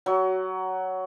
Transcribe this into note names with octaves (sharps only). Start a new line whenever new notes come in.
F#3